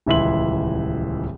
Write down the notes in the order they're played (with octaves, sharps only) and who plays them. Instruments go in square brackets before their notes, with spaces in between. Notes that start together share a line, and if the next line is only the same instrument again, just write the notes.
[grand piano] D#1 C#2 E3 E5 C6 F#7